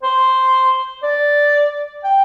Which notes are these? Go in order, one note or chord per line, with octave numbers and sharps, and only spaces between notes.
C5
D5
G5